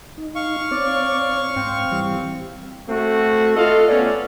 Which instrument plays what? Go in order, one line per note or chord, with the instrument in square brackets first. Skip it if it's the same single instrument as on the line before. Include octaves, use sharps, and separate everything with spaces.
[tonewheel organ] D#4
[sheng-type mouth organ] F5 C#6
[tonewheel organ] C4 C#5 [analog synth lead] D5
[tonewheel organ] G#2 [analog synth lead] C4
[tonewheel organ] E3 G3
[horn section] A3 C4 F#4
[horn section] F4 D#5 F5 [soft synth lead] A4
[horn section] A3 B3 C#4 [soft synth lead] D5